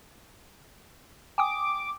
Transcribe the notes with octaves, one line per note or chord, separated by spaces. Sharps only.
G5 G#5 D6 D#6